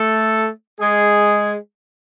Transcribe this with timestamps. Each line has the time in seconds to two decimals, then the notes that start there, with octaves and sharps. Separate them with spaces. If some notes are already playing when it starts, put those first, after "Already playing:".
Already playing: A3 A4
0.80 G#3 G#4